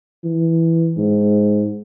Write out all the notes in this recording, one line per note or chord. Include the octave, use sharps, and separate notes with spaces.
E3
G#2